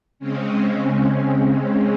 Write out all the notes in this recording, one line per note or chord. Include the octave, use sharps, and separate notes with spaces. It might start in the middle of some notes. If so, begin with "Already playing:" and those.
C#3 G#3 C4 C#4